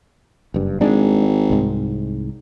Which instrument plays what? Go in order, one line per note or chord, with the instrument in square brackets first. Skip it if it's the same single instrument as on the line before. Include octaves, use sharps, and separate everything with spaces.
[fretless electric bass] F#1 G2
[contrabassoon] G#1 [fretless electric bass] G#3 D4
[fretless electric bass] C2 G#2